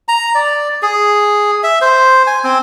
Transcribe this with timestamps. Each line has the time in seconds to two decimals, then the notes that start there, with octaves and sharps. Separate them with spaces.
0.08 A#5
0.35 D5
0.82 G#4
1.63 E5
1.81 C5
2.27 G#5
2.44 C4